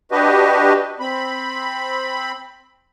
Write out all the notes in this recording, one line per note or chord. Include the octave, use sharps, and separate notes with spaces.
D4 F#4 G4 B4 D#5
C4 B5